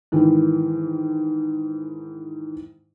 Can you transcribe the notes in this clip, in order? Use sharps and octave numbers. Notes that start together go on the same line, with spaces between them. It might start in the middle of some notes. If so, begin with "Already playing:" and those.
G#2 D#3 E3